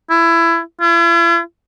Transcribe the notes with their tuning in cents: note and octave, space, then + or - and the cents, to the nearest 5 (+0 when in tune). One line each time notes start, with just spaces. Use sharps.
E4 +20
E4 +45